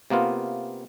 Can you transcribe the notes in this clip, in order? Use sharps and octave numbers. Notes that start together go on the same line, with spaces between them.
C3 A#3 B3 F4